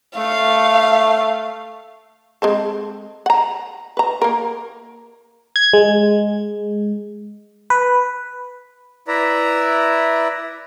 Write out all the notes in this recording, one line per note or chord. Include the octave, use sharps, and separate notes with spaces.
A3 F5
G#3 C4 A4
F#5 A#5
B4 A#5
A#3 A#4
G#6
G#3
B4
E4 B4 D5 E5 A#5